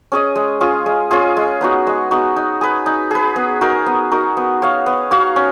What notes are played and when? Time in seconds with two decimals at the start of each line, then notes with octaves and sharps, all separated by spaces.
0.12 C#4 G#4 D#5
0.35 G#3
0.61 C#4 F4 G#4
0.86 G#3
1.11 C#4 F4 G#4
1.37 G#3
1.61 B3 D#4 F#4
1.87 G#3
2.11 B3 D#4 F#4
2.36 D#4
2.61 G#4 B4
2.86 D#4
3.11 G#4 B4
3.36 B3
3.61 D#4 F#4 A#4
3.86 B3
4.11 D#4 F#4 A#4
4.37 B3
4.62 F#4 C#5 F5
4.86 B3
5.11 F#4 C#5 F5
5.36 C#4